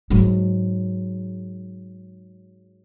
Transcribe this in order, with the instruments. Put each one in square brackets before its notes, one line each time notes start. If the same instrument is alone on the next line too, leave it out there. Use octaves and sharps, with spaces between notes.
[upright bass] G#2 F#3